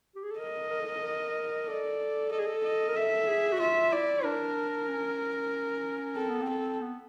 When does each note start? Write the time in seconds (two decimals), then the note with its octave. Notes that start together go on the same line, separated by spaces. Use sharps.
0.15 G4
0.24 G#4
0.31 A4
0.39 A#4 D#5
0.71 A#4
0.80 A4
0.89 A#4
0.96 A4
1.02 A#4
1.67 A4 D5
2.31 A4 D#5
2.39 G#4
2.46 A4
2.64 D#5
2.88 A#4
2.95 A4 E5
3.27 G#4
3.53 F#4
3.59 F4 E5
3.92 E4 D5
4.24 D4 A#4
4.88 C#4
6.16 C4 A4
6.29 B3
6.42 C4
6.49 A4
6.81 B3